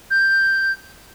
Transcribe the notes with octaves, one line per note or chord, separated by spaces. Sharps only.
G6